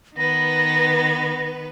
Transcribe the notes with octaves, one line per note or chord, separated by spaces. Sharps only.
D#3 B3 B4 A#6